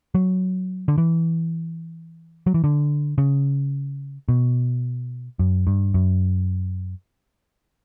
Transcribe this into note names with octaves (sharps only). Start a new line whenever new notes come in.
F#3
D3
E3
F#3
E3
D3
C#3
B2
F#2
G2
F#2